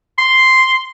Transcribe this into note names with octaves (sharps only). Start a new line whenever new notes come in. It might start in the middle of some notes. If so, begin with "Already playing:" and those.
C6